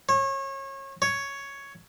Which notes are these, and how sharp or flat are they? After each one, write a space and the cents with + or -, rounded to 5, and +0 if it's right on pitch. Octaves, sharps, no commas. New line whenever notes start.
C#5 -30
C#5 +5